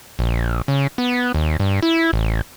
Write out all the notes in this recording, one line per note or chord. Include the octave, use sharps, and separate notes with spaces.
A#1
C#3
B3
D#2
G2
E4
A1